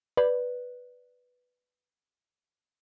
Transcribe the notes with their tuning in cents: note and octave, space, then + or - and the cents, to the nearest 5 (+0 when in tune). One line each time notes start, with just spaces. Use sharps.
B4 +0 D5 +0